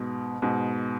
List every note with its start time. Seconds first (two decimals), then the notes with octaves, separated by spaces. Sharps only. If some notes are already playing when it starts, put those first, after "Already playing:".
Already playing: G#2 B2
0.42 G#2 B2